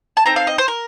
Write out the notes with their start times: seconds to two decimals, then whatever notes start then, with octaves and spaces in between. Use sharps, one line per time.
0.17 A5
0.26 C4 D#4 A4 A#5
0.36 F5
0.47 D#5
0.58 C5
0.68 A#4